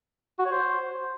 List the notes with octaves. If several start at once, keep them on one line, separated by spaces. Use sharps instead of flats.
F#4
C#5
C5